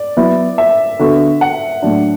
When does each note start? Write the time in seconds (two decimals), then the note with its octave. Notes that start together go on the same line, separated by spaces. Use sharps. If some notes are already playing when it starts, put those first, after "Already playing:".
Already playing: D5
0.17 F#3 B3 E4
0.58 E5
0.99 D3 B3 F#4 A4
1.41 F#5
1.82 A2 F#3 D4